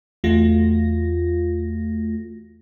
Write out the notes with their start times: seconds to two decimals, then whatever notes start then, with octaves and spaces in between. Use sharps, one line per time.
0.24 E2 A3 F4 F#4 A#6